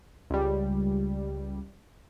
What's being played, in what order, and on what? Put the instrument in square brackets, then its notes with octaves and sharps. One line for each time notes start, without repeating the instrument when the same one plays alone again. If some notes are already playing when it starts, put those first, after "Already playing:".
[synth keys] C#2 G3